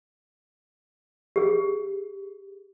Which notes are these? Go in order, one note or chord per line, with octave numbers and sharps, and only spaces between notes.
G4 G#4